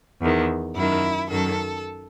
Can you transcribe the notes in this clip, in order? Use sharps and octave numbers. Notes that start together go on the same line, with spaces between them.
E2 D#3
F#2 E4
D#3
F#2 D#3 A4